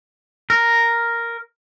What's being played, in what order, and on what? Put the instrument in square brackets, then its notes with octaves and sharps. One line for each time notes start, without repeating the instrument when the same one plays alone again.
[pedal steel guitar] A#4